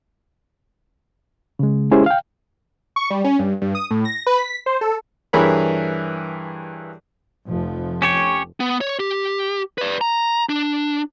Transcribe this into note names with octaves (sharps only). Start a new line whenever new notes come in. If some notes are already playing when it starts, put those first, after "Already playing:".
C#3 G#3
G#3 C#4 E4 G4 G#4 C5
F5 G5
C#6
G3
C#4
G2
G2
D#6
A2
A#6
B4
B6
C5
A4
G2 E3 G#4 A#4 C#5 B5
F1 F3
C#4 G4 C#5
B3
C#5
G4
B4 D5
A#5
D4